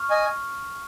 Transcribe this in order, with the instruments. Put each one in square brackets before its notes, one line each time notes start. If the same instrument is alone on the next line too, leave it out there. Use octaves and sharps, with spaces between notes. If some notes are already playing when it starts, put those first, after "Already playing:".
Already playing: [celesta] C#6 F6
[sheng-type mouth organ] D#5 G#5